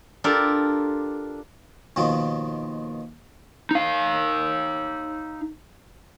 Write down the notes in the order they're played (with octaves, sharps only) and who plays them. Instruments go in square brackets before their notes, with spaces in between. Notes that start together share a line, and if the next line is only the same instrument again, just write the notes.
[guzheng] D4 F4 G4 A4 A#4
[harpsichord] D#2 B2 D#3 F3
[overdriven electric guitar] D#4 F5